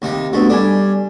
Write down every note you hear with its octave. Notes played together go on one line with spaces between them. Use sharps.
D#2 C3 D#4
G#3 A3 B3 D4 F#4
G3 D4 A4 G#5